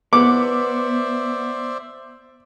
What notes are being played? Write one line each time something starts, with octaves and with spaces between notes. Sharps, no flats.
B3 C5 D5 E5 D6